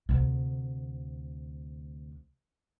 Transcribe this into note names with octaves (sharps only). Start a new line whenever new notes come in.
D2 C3